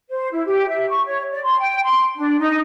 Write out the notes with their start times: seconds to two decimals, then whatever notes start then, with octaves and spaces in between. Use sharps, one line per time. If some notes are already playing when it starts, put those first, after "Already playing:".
0.09 C5
0.32 E4
0.45 G4
0.68 E5
0.89 C#6
1.06 C#5
1.31 D5
1.44 C6
1.59 G5
1.83 C6
2.15 D4
2.39 D#4